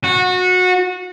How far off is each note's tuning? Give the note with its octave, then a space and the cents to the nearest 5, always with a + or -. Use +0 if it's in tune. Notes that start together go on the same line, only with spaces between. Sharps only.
F#4 -20